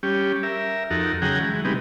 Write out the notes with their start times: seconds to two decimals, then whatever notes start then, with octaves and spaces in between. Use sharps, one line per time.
0.03 G3 C#4 G4
0.43 A#4 E5
0.90 F2 D#4 F#4 A4 A#4
1.22 C#3 F#3 G#4 F#5 G5 A#5
1.40 E3 G#3
1.65 C3 G3 G#3 B3 D#4